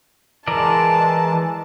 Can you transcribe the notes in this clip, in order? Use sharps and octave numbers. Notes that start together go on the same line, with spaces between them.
E3 G#3 A#4 D5 A5